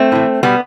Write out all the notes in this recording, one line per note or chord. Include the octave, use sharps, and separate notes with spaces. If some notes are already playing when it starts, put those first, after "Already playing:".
Already playing: A3 C4
A2 E3
B2 G3 B3